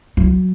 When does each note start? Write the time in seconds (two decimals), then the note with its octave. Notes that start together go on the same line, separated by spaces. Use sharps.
0.17 F#3